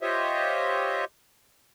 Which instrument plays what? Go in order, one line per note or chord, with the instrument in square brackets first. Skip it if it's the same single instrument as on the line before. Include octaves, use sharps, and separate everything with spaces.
[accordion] F4 G4 C5 C#5 D#5 E5